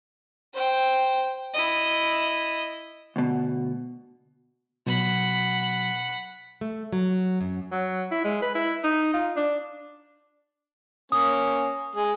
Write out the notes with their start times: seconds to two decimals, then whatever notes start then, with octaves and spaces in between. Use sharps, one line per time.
0.54 C5 G5
1.54 E4 D#5
3.16 D2 B2
4.87 B2 F#3 F#5 B5
6.61 A3
6.92 F#3
7.41 F#2
7.71 F#3
8.11 E4
8.24 G#3
8.42 B4
8.55 E4
8.84 D#4
9.13 F4
9.36 D4
11.12 A#3 C#4 D#6
11.95 G#3 G#4